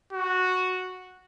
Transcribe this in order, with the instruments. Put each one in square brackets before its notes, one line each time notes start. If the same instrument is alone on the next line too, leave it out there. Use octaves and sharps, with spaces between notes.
[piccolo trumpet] F#4